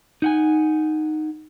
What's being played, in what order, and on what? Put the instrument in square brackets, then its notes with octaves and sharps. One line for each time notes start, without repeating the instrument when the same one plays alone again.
[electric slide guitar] D#4 F#5 G#5